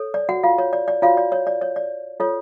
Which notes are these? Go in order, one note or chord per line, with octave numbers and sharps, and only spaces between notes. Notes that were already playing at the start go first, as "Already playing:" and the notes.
Already playing: A4 C#5
D5
F#4 F#5
F4 F5
C#5
D5
D5
F4 F#4 C#5 F5
D5
C#5
D5
C#5
D5
F4 A4 C#5